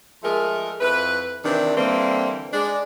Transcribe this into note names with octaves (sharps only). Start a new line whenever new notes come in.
F3 G#3 A3 G#4 A#4
F2 E4 B4
C3 D#3 E3 D4
D3 E3 G3 A#3 C4
G#3 D4 D5